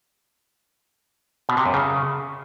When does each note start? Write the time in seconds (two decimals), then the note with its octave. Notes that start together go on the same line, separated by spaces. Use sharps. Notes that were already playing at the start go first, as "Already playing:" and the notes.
1.49 B2
1.57 C3
1.66 F#2
1.74 C#3